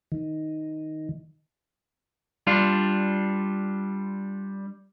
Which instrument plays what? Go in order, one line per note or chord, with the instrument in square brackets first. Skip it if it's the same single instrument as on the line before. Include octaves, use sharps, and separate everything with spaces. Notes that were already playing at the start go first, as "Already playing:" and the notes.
[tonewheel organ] D#3
[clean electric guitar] G3 D4 F4